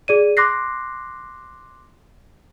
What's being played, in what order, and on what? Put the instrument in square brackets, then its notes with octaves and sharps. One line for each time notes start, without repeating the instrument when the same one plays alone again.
[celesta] G#4 D5 D#7
C6 D6 F#6 A#6 C7